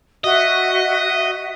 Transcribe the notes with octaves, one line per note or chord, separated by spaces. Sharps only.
F#4 D#5 E5